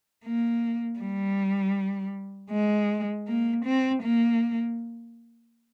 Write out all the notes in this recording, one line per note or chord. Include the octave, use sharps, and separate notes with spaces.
A#3
G3
G#3
A#3
C4
A#3